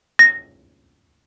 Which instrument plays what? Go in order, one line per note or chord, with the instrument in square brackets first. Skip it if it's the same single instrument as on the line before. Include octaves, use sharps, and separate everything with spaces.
[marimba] A#6